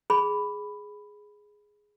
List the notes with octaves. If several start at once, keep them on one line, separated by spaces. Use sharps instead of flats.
G#4 B5